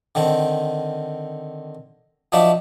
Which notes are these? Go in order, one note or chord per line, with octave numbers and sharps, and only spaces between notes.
D3 D#3 C4
F3 F#3 D4 D#4 D5 E5